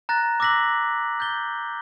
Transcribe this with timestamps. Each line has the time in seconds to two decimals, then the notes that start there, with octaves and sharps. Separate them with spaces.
0.09 A#5 F#6 A6 A#6
0.40 D6 E6 F#6 A#6 B6 F#7
1.20 G6 A6 G7